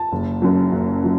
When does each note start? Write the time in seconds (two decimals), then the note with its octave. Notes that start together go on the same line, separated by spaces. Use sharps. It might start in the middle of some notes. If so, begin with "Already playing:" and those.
Already playing: A5
0.12 F#1
0.42 F#2 F#3
0.72 F#1
1.04 F#3